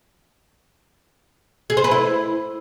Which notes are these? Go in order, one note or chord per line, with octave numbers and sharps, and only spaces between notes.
G#4
C5
B4
E4